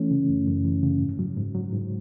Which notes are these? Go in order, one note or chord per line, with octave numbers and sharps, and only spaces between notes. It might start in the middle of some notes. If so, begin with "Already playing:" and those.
Already playing: E3 A3 C#4
C#3
F#2
F#2
E3
C#3
G#2
F#3
G#2
F#3
G#2